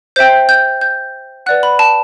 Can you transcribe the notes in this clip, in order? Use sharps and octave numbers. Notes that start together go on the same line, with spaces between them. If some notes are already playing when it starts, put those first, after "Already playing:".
C5 E5 G5 G6
G6
G6
B4 D5 F#5 F#6
B5
A5